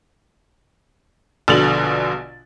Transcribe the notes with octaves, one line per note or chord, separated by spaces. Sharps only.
A#1 B2 D3 A6 F7 F#7